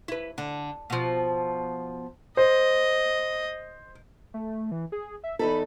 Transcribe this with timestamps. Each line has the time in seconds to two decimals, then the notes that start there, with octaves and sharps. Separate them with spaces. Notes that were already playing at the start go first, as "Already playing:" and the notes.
0.08 E4 B4
0.38 D3
0.90 B2 F3
2.37 C5 D#5
4.34 A3
4.71 E3
4.92 G#4
5.24 E5
5.39 E2 D#4 A4 B5